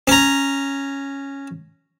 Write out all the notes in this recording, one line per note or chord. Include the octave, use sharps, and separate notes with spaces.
C#4 A#5